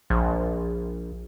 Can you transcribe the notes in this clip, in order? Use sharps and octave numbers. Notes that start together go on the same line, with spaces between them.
A#1